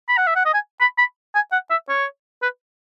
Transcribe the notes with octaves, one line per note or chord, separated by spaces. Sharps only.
B5
F#5
E5
F#5
D#5
G#5
B5
B5
G#5
F#5
E5
C#5
B4